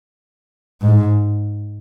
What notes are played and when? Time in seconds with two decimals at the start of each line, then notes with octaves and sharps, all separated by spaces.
0.82 G#2